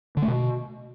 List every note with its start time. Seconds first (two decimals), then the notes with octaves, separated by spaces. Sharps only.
0.17 D3
0.22 A3
0.28 B2